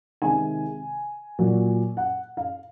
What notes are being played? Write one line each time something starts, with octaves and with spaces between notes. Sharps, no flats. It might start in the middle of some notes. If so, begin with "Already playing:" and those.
C3 D#3 G#3 G#5
A#2 F#3
F#5
F5